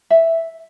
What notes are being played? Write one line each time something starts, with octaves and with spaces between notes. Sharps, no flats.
E5